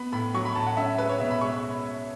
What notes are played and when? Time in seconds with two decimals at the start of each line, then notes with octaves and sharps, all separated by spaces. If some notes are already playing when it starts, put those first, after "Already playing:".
Already playing: B3 B5
0.12 A2 B5
0.34 F#3 C#6
0.45 B5
0.55 A2 A5
0.66 F#5
0.77 C#4 E5
0.98 G#3 B4
1.09 C#5
1.20 B2 E5
1.30 B5
1.41 G#3 C#6